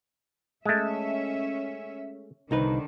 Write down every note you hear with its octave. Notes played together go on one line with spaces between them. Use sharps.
G#3 A3 C#4 E5
C2 D3 D#3 D#4 B4